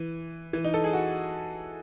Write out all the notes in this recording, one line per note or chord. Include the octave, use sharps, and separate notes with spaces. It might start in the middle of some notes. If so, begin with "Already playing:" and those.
Already playing: E3
E3
D#4
A4
G#4
F#4